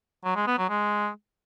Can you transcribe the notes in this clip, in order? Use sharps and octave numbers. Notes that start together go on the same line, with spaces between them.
F#3
G#3
B3
F#3
G#3